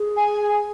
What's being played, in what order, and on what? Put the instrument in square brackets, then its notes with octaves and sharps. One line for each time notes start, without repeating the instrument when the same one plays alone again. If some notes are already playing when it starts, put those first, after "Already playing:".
Already playing: [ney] G#4
[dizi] G#5